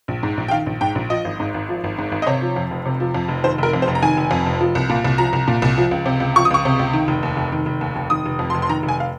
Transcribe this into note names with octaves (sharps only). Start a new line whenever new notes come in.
A#1
G#2
A#1
G5
D#3 F5
A#1
G#2 G5
A#1
F3 D#5
G#1
G#2
G#1
F3
G#1
G#2
G#1
D#5
C3 C#5
F3
F2
F1
C3
F3
F2
F1
D#3 C5
F1 A#4
F2
C5
F1
A#5
D#3 G#5
F1
F2
F1
F3
C2
A#2
C2
F3 A#5
C2
A#2
C2
F3
C#2
C3
C#2
F3 C#6
D#6
C#2 C#6
C3
C#2
D#3
F1
D#2
F1
D#3
F1
D#2
F1
D#3 D#6
F1
F2
C6
F1
C6
D#3 A#5
F1
G#5
F5